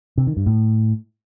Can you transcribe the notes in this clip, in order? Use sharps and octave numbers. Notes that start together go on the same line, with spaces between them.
C3
D#3
G2
A2